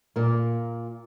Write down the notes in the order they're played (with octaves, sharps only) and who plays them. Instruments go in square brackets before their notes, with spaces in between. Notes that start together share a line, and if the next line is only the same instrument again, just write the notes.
[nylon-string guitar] A#2 A#3